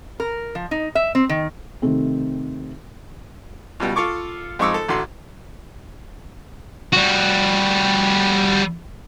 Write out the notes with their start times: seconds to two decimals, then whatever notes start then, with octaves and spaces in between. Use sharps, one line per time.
0.20 A#4
0.55 F3
0.71 D#4
0.95 E5
1.15 C4
1.29 D#3
1.82 C3 D#3 A3 C4
3.80 C#2 B2 G3
3.96 F4 A4 C#6 D6
4.59 F2 G#3 D#4 C#6 D6 E6
4.74 A4
4.88 A1 D3 F#4 C6
6.93 G3 F#4